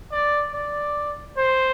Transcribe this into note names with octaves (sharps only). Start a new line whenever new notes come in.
D5
D5
C5